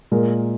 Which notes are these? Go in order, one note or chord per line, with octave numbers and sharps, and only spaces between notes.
A#2 G#3 A#4